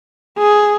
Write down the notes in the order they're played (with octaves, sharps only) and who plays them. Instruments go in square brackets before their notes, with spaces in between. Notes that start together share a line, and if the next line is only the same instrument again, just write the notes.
[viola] G#4